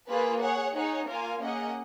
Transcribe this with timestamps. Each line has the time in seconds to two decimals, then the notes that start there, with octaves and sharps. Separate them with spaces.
0.08 A#3 F4 G#4 B4
0.41 G#4 C#5 F#5
0.74 D#4 G#4 C#5 F#5
1.07 A#3 F4 A#4 F5 G#5
1.39 A#3 C#4 G#4 D#5 F#5